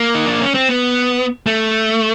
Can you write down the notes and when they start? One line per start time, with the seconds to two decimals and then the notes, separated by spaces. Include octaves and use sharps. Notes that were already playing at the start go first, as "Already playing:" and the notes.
Already playing: A#3
0.15 D#4
0.27 D4
0.41 C#4
0.54 C4
0.69 B3
1.46 A3